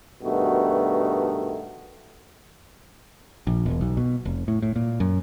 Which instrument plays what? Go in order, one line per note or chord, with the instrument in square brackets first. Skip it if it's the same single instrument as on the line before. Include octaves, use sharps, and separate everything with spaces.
[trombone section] G2 B2 D#3 A3 F#4
[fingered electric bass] A#1
E1
B1
B2
F1
A2
A2
A#2
F#2